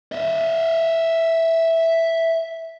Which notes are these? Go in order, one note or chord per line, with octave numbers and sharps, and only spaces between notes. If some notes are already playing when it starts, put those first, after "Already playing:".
D#5 E5